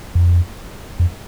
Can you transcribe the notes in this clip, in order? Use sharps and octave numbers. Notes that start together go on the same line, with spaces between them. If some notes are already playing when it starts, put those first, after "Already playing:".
F2
F2